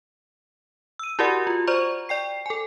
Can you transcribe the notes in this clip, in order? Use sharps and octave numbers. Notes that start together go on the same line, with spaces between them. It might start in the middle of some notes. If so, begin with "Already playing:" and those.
E6 D#7
E4 F#4 G4 A#4 D5 F#5
F4
C5 D5 A#5 C#6
D5 G5 C7
A4 G#5